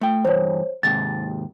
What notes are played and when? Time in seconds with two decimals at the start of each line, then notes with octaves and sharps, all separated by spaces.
0.01 A3 G5
0.25 E2 G2 C5 C#5
0.83 D#2 G#2 C3 A6